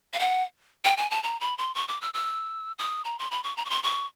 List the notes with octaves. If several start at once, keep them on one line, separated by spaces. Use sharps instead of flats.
F5
F#5
G5
G#5
A5
A#5
B5
C6
C#6
D6
E6
E6
D#6
A#5
C6
B5
C#6
A#5
C#6
C6
C#6